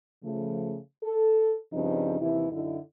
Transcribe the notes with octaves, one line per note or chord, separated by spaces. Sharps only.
C#3 F3 A3
A4
G2 C#3 F3 G3 C4 D#4
D#2 C3 E3 E4
F#2 D3 D#4 E4